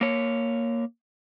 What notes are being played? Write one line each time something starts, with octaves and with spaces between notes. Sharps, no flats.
A#3 C#5